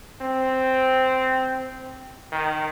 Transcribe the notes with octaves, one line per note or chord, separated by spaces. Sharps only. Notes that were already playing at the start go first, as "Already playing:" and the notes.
C4
D#3